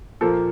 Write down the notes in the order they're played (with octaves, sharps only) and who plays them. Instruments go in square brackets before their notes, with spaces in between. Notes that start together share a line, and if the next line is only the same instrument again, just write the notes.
[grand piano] A#2 F3 A#3 A4